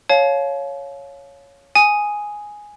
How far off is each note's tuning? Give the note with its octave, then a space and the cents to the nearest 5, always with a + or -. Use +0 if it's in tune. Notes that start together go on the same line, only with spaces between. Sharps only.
C#5 +0 F5 +5 A5 -45
G#5 +0 D#6 +0